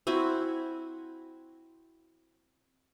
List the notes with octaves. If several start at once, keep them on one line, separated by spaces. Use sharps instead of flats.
C4 E4 F#4 G#5